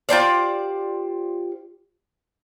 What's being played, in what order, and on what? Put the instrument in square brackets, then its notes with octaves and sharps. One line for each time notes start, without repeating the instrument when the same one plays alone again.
[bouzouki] F4 G4 C5 D5